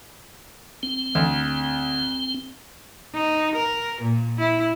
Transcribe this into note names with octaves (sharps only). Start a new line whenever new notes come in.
C4
D2
D#4
A#4
A#2
E4